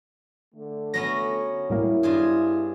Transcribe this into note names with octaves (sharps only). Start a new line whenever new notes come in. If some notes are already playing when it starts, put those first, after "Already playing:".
D3 A3
F#3 B3 C#4 A#6
A2 G3 A#3 E4
G2 F4 G#4